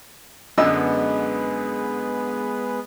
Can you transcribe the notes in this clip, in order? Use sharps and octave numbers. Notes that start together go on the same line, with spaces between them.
F#2 D3 G#3 B3 D#5 E6